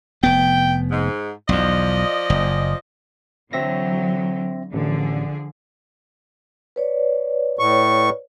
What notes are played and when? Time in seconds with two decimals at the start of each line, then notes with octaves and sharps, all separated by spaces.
0.23 F1 B3 G5
0.91 G#2
1.49 B1 E2 F3 D5 D#5
2.30 F#1
3.53 D3 E3 F#3 C4 E5 A#6
4.73 A1 D3 F3 G#4
6.76 B4 C#5 D5
7.59 A2 C#6